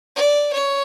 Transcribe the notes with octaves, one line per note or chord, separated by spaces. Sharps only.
D5
C#5